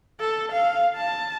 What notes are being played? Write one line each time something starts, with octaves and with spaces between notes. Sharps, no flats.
A4
F5
A5